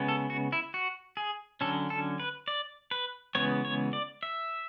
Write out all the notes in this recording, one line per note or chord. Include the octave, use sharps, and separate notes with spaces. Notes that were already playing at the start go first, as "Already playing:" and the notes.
Already playing: C#3 G#3 B3
A4
F#4
E4
F#4
G#4
D3 F#3 C#4 A4
A4
B4
D5
B4
C#3 E3 G#3 B3 C#5
C#5
D5
E5